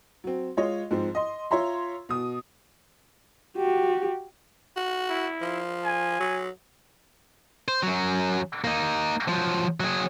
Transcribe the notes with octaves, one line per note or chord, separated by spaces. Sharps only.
F#3 C4
G#3 F4 C#5 D#5
G#2 F3 C4
D#5 C6
F4 C#5 E5 A#5 C6
B2 D#6
F#4 G4
F#4
E4
F3
G#5
F#3
C5
F#2 F#3
A#3 D#4
F3 F#3
F#3 G#4